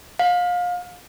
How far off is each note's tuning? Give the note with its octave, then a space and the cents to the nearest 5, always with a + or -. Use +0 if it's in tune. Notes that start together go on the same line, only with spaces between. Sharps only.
F5 +30